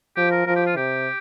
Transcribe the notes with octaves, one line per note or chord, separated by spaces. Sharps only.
F3 G4
A#4
F3 A#4
G4
F4
C3 G4